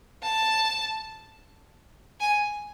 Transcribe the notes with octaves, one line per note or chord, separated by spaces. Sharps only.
A5
G#5